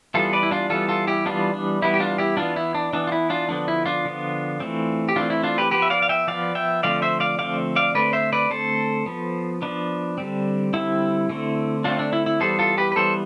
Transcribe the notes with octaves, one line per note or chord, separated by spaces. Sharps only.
E3 G3 B3 F4 A4
B4 D5
E4
D4 F4
E3 G3 B3 F4 A4
F4 A4
E4 G4
E3 G3 B3 D4 F4
D4
E3 G3 B3 E4
G4
D4 F4
E4 G4
E3 B3 D4 F4
E4
D4
E3 B3 D4
F4
E4
D4 F4
D3 F3 B3 D4
E4
D4 F4
D3 F3 B3
E3 A3 C4
G4
E3 A3 C4 D4 F4
E4
D4 F4
G4 B4
F3 B3 G4 B4
E5
D5 F5
F5
E5 G5
F3 B3 D5 F5
E5 G5
D3 F3 A3 C4 D5 F5
C5 E5
D5 F5
D3 F3 A3 C4 D5 F5
D5 F5
D3 A3 C4 B4 D5
C5 E5
B4 D5
D3 A3 C4 A4 C5
F3 B3
F3 B3 D4
D3 G3 C4
D3 G3 C4 E4
D3 A3 C4
D3 A3 C4 D4 F4
D4
E4
E4
E3 G3 B3 A4 C5
F4 A4
G4 B4
B4
E3 G3 B3 A4 C5